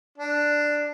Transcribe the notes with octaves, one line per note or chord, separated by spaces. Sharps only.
D4